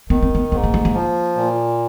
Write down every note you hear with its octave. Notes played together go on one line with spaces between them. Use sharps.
D#3 B3
C4
B3
G#2 B3
A#3
A3
A#3
F3
A#2